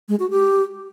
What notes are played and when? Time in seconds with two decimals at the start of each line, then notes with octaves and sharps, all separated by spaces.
0.09 G#3
0.20 F#4
0.30 G4